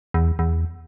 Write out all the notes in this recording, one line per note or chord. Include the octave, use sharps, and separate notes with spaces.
E2
E2